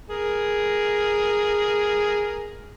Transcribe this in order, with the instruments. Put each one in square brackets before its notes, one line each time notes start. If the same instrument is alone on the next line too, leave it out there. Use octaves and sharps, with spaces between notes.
[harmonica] G#4 A#4